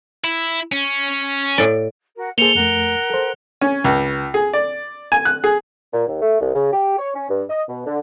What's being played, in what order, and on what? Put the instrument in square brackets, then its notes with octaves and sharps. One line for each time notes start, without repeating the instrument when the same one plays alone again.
[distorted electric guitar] E4
C#4
[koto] A2 D5
[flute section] F#4 A#4 F#5
[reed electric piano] A#3 G#4 [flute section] A4 C5 [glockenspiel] C#7 F7 G7
[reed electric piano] F2 A3 [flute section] A#4 F#5 F#6
[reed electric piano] A4 C5
[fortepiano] C#4
C#2
G#4
D5
G#5
F#6
G#4
[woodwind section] A#2
D#2
A3
C2
C#3
G4
C#5
C#4
G2
D#5
B2
D3